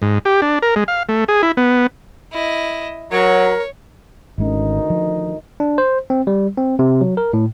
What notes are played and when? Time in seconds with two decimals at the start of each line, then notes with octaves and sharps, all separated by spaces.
0.02 G#2
0.25 G4
0.42 D4
0.62 A#4
0.76 G#3
0.88 F5
1.09 A3
1.28 G#4
1.43 E4
1.57 B3
2.32 E4 D#5
3.11 F#3 A#4 C#5
4.38 G#1 D2 D#3 G#3 C#4 D#4
4.90 F3
5.60 D4
5.78 C5
6.10 C4
6.27 G3
6.57 C4
6.79 C3
7.01 F#3
7.17 A#4
7.33 A2